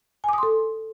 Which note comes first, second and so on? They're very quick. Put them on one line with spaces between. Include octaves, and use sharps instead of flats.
G#5 D6 D#6 C6 A4